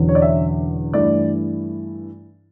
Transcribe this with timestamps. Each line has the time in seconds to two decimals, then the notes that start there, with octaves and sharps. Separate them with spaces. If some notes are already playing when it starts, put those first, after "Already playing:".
Already playing: E1 E2 D3 F#3 C#4
0.09 C#5
0.15 D5
0.22 E5
0.93 G2 E3 A3 D5